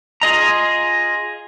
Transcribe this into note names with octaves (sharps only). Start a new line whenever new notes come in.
F4 G#4 D#5 A#5